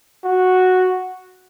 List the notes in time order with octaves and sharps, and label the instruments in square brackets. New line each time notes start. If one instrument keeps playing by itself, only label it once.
[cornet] F#4